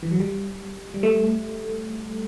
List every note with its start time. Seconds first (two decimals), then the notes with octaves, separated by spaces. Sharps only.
0.03 E3
0.11 F#3
0.20 G3
0.94 G3
1.03 A3